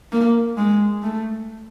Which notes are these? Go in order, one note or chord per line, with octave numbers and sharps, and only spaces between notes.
A#3
G#3
A3